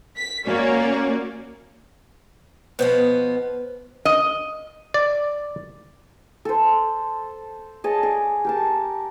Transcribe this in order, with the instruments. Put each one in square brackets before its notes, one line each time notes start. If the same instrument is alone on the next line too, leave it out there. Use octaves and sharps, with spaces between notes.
[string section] B6
A#3 C#4 F#4 C#5 D5
[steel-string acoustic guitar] B2 F3 B3 [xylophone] B4 C5
[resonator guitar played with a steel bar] D#5
[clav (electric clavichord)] D5
[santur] A4 C5
G#4 C#5 D#5 A5
G#4 D5
G4 A#4 A5